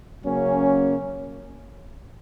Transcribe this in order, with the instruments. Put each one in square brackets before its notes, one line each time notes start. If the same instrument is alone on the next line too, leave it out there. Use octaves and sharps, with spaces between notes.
[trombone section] C#3 F#3 A#3 C#4